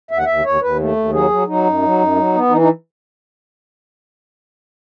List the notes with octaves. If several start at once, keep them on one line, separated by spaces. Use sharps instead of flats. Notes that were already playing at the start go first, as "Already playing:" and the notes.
D#2 E5
F#5
D#2 E5
D#2 C#5
D#2 B4
A3
D#2
F#3 G#4
F#3
F#3 D#4
F#2
F#3
F#2
F#3
B3
E3 D#4
D#4